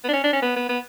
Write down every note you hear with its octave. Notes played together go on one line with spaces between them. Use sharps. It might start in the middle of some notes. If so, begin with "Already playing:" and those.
B3
D4
C#4
D4
C#4
B3
B3
B3